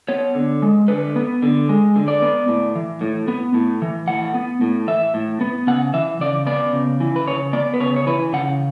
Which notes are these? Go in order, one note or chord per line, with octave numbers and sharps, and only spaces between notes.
B3 C#5
D3
G#3
D3 B4
B3
D3
G#3
D3
D5
B3
A2
E3
A2
B3
A2
E3
A2 F#5
B3
A2
E3 E5
A2
B3
C#3 F#5
E3 E5
C#3 D5
B3 D5
C#3
E3
B4
C#3 C#5
B3 D5
B4
C#3 C#5
C#5
E3 B4
C#3 F#5